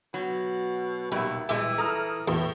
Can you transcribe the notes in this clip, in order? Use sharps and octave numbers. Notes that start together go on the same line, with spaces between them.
B2 F#3
D#2 B2 G3 E5
E3 G3 G#3 G4 E5
A4 A#5 D#6 F6
E2 A2